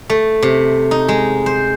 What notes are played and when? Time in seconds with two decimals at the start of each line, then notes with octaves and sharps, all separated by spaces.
0.10 A3
0.43 C3
0.91 D#4
1.08 G#3
1.46 C5